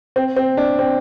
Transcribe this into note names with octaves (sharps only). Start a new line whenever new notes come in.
C4
C4
D4
C4